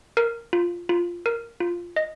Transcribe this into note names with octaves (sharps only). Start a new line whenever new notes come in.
A#4
F4
F4
A#4
F4
D#5